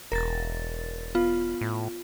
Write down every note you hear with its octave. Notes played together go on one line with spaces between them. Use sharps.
E1 A#4 A6
B3 F4
A2